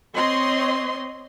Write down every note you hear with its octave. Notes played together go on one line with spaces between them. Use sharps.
C4 C#5 D#5 C6